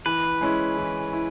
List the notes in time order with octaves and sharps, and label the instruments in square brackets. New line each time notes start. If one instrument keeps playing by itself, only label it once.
[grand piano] E3 [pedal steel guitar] B4
[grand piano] G#3 C#4 E4
E3
E4